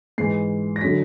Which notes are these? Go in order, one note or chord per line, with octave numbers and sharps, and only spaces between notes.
G#2 E3 C7
A#6
D3 F#3 B6